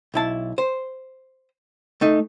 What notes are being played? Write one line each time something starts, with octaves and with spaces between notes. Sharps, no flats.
B1 E4 A5
C5
A3 D#4